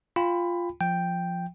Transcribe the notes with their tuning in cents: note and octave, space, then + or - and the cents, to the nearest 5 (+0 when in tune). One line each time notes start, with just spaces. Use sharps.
F4 +0 G5 +20 B5 +15
F3 +0 G5 +0